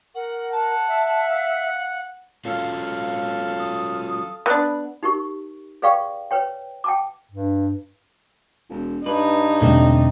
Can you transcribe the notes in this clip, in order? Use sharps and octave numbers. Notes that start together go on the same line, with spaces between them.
A#4 F#5
F#5 A5
E5
F5
F#3 C#4 F4 A4 F5
D#6
B3 D4 B5
D#4 G4 A#4 C#6
G#4 B4 D5 F5 G5 C#6
B4 C#5 G5
G5 A5 D6
G2
E1
G2 D#4 B4
E2 B2 D3 G3 A3 C4